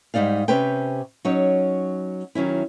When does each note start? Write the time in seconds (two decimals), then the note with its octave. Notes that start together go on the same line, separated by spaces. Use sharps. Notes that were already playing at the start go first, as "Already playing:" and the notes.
0.14 G#2 G3 D#4 D5 F5
0.48 C3 C#4 G4 B4 C5 G5
1.25 F#3 C#4 D#4 C#5
2.35 D#3 F#3 C#4 E4